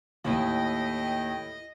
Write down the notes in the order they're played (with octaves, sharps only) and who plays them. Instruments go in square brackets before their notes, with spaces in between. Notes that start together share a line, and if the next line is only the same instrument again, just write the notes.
[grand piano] D#2 [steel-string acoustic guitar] A2 E4 [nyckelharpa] D#5 [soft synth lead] G5